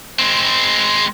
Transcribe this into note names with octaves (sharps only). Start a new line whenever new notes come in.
G#3 C4